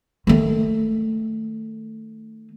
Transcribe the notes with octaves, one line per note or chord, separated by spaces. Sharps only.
D#3 A3